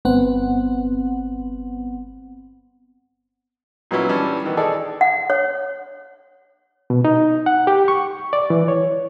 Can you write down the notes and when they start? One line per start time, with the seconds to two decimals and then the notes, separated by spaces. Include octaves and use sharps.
0.05 G1 B3 C4 F#5
3.91 A#2 F#3 B3 C#4 E4
4.09 E3 G3 C#4 D4
4.44 D#3 E3 B3
4.57 D#4 G#4 A4 D5
5.01 F#5
5.30 C#5
6.90 B2
7.05 D#4
7.46 F#5
7.67 G4
7.88 C#6
8.33 D5
8.50 E3
8.68 C#5